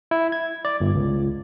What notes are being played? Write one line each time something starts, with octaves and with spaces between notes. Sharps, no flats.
E4
G#6
D5
G1
C#2